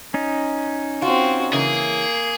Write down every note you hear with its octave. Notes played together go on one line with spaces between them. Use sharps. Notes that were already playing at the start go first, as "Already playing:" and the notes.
C#4 D#4
C4 F4 F#4
C#3 E3 A#3 G#4